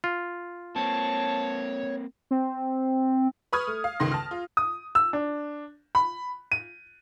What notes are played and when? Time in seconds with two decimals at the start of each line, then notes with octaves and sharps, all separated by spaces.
0.04 F4
0.76 A#3 C4 C#5 A5
2.31 C4
3.53 B4 B5 C#6 D#6 F6 G#6
3.67 A3
3.84 F5
4.00 G1 C#2 D#3 C6 A#6
4.12 A5 F6
4.31 F4
4.57 D#6
4.95 E6
5.13 D4
5.95 B5
6.52 D#7